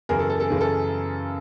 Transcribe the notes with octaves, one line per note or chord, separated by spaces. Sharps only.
F#2 C#3 E3 G#4 A#4
A4
A4
A4
F#2 C#3 E3 G#4
A4